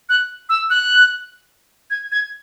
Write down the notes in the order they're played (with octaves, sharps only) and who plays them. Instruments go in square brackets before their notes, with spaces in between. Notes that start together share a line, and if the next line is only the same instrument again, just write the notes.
[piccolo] F#6
E6
F#6
G#6
G#6